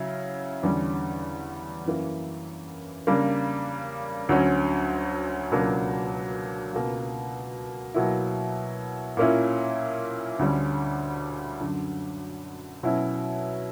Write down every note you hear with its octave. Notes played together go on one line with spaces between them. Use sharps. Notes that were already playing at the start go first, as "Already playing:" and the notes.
Already playing: C#3 F#3 C#4 E4
E2 D3 G3 C#4
F#2 E3 A#3
C#3 G3 A#3 D4
D2 D3 F#3 C#4
C#2 B2 F#3 A#3 D4
C#2 B2 A#3
B2 F#3 A#3 E4
A#2 A#3 C#4 E4
D2 D3 G3 C#4
F#2 D3 F#3
B2 F#3 C#4 E4